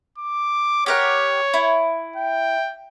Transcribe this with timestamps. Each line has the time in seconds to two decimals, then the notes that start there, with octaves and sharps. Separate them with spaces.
0.18 D6
0.86 G4 A#4 C#5 F#5
1.54 E4
2.16 G5